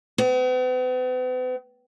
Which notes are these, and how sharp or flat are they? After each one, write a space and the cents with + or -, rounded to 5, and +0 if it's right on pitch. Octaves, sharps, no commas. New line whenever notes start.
B3 +45